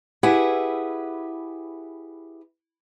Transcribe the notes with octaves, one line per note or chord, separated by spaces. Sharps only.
E4 G4 G#4 B4 E5 F#5